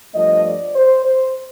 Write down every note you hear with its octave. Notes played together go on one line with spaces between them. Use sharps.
G2 F3 A3 D#5
D5
C5
C5